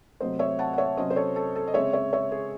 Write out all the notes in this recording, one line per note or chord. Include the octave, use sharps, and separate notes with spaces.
C3 F#3 A3 C4 C5 D#5
C#5 E5
F#5 A5
F#5
C#5 E5
C3 F#3 C#4 C5 D#5
C5
A4 C#5
A4
A4
D#5
C#3 G#3 C4 C#5 E5
C#5 E5
C#5 E5
G#4